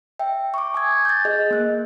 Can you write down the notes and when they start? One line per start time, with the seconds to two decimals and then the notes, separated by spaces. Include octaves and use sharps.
0.19 E5 G5
0.54 C#6 D6
0.74 G#5 D#6 G#6
1.05 G6 A6
1.25 G#4 D#5
1.51 A#3 F#6